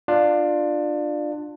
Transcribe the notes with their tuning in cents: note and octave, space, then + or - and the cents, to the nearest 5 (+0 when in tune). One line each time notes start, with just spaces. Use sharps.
D4 +20 F4 +10